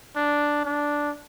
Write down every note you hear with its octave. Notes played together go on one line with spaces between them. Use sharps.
D4
D4